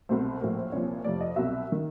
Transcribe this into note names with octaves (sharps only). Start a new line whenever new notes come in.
C2 B2 F#3 A3 C5
A#1 A2 F#3 A#3 C5
C5
C2 A#2 F3 C#5
F2 C3 F3 A3 D5
D#5
C2 B2 F#3 E5
D#3